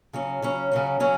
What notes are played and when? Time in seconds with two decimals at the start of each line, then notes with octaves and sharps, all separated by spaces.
0.13 C#3 F#3 C#4
0.42 C#3 F#3 C#4
0.72 C#3 F#3 C#4
1.00 C#3 F#3 C#4